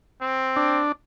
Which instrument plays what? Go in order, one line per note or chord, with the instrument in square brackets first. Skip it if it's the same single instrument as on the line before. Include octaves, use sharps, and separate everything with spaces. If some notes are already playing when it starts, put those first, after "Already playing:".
[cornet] C4
[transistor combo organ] D4